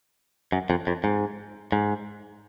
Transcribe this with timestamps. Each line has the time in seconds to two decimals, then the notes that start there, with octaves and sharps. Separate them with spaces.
0.52 F#2
0.70 F2
0.87 F2
1.04 G#2
1.72 G#2